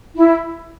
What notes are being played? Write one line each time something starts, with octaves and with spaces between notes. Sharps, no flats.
E4